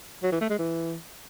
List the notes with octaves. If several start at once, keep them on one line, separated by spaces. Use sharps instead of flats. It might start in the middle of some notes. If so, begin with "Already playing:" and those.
F#3
E3
A3
G#3
E3